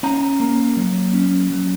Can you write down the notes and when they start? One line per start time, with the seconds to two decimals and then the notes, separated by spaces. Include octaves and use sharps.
0.03 C#4 A#5
0.40 A#3
0.77 F#3
1.13 C#4
1.50 F#3